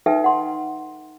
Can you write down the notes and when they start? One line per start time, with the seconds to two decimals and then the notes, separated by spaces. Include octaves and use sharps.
0.06 D#4 A4 B4 E5 G5
0.24 F#5 C6